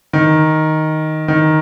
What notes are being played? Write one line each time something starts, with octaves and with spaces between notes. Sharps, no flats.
D#3
D#3